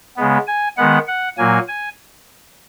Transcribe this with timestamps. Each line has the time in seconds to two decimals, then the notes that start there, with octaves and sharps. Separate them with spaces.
0.17 C#3 G#3 B3
0.47 G#5
0.77 D#3 G#3 B3 F#5
1.07 F#5
1.37 A#2 F#3 A#3 G#5
1.68 G#5